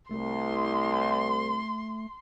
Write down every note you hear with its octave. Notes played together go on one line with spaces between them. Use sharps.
C2 A3 C6